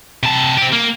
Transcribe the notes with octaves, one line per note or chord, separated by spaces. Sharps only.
C3 A5
C4 G4
A#3